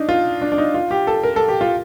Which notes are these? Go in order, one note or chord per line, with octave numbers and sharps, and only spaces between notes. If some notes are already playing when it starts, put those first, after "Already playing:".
Already playing: D4 D#4
F4
D4
D4
D#4
F4
G4
A4
A#4
A4
G4
F4